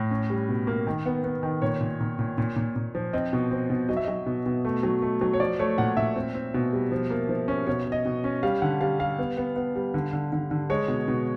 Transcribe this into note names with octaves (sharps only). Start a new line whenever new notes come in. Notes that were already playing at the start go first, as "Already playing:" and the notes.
Already playing: A2
C#4
G3
B2
A#3
D#3
B3
B3
D#3
A#2 C#5
A#2
A#2
A#2
A#2
A#2
A#2
F3
C4 D#5
B2
C4
B2
F#3 D#5
E5
F#3 D#5
B2
B2
A3
F#3
A3
F#3
C#5
F3 D5
A3 C#5
A#2 F#5
A#2 E5
C4
C4
B2
G3
F3
A#3
F3
C#4
B2 C#5
B2
D#5
B2
C#4
G3 F5
D3 F#5
G3 F5
G3 F5
B3
B3
B3
G3
D3
D3
D3
D3
G#3 C#5
B2
B2